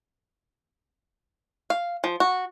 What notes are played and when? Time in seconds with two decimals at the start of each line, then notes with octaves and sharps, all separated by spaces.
1.70 F5
2.04 F3
2.20 F#4